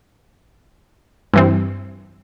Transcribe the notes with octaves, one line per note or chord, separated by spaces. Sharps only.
G2 E3 C4